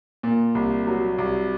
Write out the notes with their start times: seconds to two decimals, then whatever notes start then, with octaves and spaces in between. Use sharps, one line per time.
0.23 A#2
0.55 C2
0.87 F#3
1.18 C2